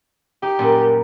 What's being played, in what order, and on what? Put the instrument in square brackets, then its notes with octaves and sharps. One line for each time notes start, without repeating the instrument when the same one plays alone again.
[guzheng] D#4 [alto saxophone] G4
[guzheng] F#2 A#2 G3